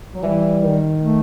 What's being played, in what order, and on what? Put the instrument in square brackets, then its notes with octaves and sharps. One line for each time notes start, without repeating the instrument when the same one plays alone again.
[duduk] F#3
[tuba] E3 [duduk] G3
[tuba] D#3
[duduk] A3